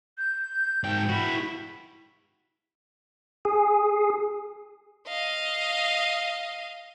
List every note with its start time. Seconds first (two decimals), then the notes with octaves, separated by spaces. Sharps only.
0.18 G6
0.84 G#2 G5
1.09 E4 F#4
3.45 G#4
5.08 D#5 F5